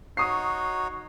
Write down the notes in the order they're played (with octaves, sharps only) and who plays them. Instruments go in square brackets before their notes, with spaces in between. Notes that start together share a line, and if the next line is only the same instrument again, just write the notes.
[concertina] D#4 F#4 C#5 [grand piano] C#6 D#6 C7